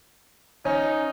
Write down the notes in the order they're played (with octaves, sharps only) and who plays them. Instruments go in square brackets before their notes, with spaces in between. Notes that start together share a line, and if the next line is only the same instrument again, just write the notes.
[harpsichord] C#4 [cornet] D#4